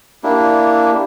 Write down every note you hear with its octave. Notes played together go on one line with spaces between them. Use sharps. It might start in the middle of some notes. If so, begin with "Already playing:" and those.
A#3 D4 E4 G4